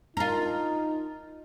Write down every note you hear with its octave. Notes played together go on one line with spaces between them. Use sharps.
D#4 F4 A#4